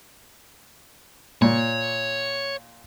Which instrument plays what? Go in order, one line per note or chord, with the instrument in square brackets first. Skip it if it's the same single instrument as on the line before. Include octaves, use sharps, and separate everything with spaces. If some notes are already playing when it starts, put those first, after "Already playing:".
[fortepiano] A#2 [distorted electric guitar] C#5